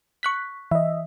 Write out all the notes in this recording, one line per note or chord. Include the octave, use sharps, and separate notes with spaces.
C#6 F#6 B6
E3 D#5 E5